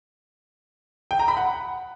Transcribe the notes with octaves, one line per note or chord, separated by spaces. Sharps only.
G5
A#5
B5
F#5